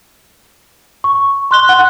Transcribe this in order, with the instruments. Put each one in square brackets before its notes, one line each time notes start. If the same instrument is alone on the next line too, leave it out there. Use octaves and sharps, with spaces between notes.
[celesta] C#6
C6 F#6 G7
F#5 F#6